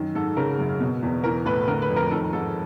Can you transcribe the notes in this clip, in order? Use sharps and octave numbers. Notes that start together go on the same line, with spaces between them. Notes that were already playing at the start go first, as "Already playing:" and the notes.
Already playing: F#2 D#3
G#2 A4
C#3 A#4
F#2
B2
E2
E3 A#4
A2 B4
D3 A#4
B4
F2
A#4
D#3 A4
G#2 A4